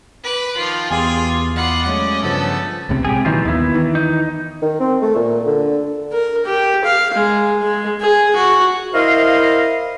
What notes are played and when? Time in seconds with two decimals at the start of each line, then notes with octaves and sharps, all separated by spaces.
0.23 B4 D6
0.57 D#3 F3 F4
0.91 E2 G4 G#4 F5 G#5 C6
1.56 E2 F4 D5 D#5 F5 F#5 B5
1.86 F#3 G#3 A3 C#4
2.23 G2 C#3 F3 A3 B3 A4
2.89 C#2 A2 C3
3.05 C3 G#3 G4 G#4
3.25 A#2 D#3 E3 F#3 D#4 F4
3.45 D#2 B3 E4
3.74 D#3 E3
3.95 D#4
4.62 D#3
4.80 C4
5.02 A3
5.15 A#2
5.46 D3
6.12 A#4
6.46 G4
6.85 F5
7.14 G#3
7.62 G#3
8.01 G#4
8.36 F#4
8.93 E4 A#4 C5 D#5 F5